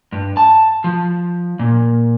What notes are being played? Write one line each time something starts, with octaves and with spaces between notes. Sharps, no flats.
G2
A5
F3
A#2